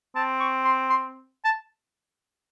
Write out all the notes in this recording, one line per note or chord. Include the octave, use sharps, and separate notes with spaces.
C4 A5
C#6
C6
C6
A5